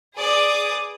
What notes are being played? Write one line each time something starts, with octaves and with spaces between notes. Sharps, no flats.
G#4 B4 D5 D6 D#6